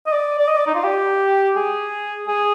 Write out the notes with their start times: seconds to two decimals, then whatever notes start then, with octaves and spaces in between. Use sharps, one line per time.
0.07 D#5
0.12 D5
0.39 D5
0.48 D#5
0.57 D5
0.67 D#4
0.75 F4
0.84 G4
1.56 G#4
2.27 G#4